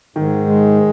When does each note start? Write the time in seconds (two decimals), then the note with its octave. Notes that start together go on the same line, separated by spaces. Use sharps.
0.16 G#2 D#3
0.47 G#3